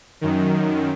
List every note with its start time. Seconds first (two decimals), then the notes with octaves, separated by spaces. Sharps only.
0.21 F#2 D#3